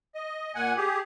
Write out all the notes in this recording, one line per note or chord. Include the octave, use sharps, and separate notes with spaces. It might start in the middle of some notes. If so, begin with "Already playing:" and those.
D#5
A#2 F#5 G#5
G4 G#4